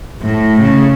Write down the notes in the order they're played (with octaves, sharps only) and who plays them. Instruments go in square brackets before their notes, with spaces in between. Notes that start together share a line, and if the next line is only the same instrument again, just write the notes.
[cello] A2
C#3